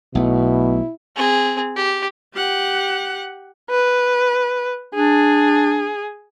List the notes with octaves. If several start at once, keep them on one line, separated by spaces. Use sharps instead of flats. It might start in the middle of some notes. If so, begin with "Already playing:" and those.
B1 B2 A3 E4
C4 G#4
G4
G4 F#5
B4
D4 G#4